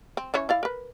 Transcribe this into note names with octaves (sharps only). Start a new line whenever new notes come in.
C4
E3 C#4 C#5
E4 D5 F5
A#4 B4